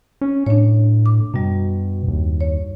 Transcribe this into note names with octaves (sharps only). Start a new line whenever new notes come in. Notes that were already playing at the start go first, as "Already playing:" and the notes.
C#4
A2 D4 C#5
D6
F#2 B2 G3
D#2
C#5